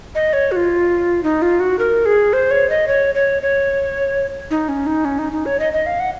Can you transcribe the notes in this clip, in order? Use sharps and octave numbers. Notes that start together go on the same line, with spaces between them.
D#5
C#5
F#4
F4
D#4
F4
F#4
A#4
G#4
C5
C#5
D#5
C#5
C#5
C#5
D#4
C#4
D#4
C#4
D#4
D#4
C#5
D#5
D#5
F5
F#5